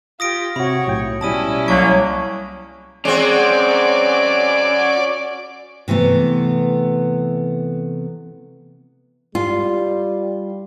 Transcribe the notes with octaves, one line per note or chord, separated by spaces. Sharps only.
F4 G4 D#6 A#6 D7
C3 F#4 C#5 B5
B1 A2 G5
B2 G3 C#4 E4 A5 D#6 D#7
C2 F#3 A#3 C#6 G#6
G#3 C4 C#4 F#4 D5
C3 E3 A3 B3
G3 F4